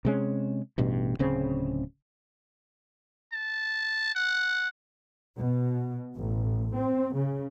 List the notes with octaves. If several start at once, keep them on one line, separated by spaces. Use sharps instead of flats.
C3 G#3 C#4
A1 G2 B2
D1 C#3 C4
A5
F#5
B2
A1
C4
C#3